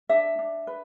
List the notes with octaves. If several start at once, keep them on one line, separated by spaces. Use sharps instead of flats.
D4 E5
D4
B4